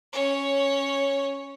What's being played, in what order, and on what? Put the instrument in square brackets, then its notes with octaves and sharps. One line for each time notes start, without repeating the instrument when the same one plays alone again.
[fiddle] C#4 C#5